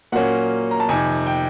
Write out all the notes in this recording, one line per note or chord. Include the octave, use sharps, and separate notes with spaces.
A#2 F#3 A#3 C#4 F#5
A#5
A5
F2 C3 D#3 G#5
G5